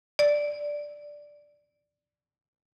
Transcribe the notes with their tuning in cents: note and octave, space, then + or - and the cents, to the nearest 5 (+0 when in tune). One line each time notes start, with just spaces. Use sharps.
D5 +0